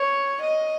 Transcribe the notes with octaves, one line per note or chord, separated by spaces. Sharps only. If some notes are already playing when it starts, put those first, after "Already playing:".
Already playing: C#5
D#5